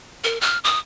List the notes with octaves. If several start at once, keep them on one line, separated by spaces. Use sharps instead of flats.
A#4
F6
D#6